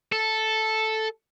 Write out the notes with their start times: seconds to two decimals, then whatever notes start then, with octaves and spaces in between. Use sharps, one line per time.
0.12 A4